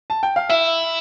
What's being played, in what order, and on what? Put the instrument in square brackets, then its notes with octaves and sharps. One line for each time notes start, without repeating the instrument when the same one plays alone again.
[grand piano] A5
G5
F5
[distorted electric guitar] E4 [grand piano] E5